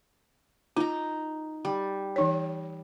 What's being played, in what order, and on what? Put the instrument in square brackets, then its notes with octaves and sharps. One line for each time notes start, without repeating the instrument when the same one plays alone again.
[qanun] D#4 A#5 [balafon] F4
[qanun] G3
[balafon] E3 D#4 C#5